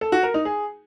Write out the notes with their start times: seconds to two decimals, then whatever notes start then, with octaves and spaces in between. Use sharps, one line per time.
0.01 A4
0.12 F#4
0.23 A#4
0.34 D#4
0.45 G#4